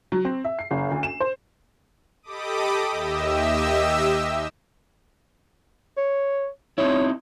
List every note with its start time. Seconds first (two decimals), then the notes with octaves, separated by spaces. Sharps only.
0.12 F#3
0.25 C4
0.45 E5
0.59 C7
0.71 F#1
0.91 D2
1.03 E7
1.20 C5
2.23 G4 A4 D#5 B5 D6 D#6
2.91 D#2 G4 D#5 E5 E6
5.97 C#5
6.78 C4 D#4 E4 C#5